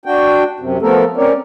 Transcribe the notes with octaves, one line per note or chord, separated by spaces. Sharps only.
D4 F#4 G5
F#2 C3
F3 A3 B3 A4 A#4
C4 C#4 A#4 C#5 D5